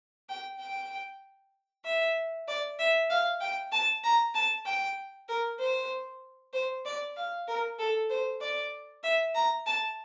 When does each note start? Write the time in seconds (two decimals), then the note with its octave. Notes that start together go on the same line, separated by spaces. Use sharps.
0.29 G5
0.59 G5
1.85 E5
2.48 D5
2.79 E5
3.10 F5
3.41 G5
3.72 A5
4.04 A#5
4.35 A5
4.66 G5
5.29 A#4
5.59 C5
6.53 C5
6.85 D5
7.17 F5
7.48 A#4
7.79 A4
8.10 C5
8.41 D5
9.03 E5
9.35 A#5
9.66 A5